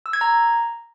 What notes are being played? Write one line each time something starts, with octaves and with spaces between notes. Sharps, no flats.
E6
G#6
A#5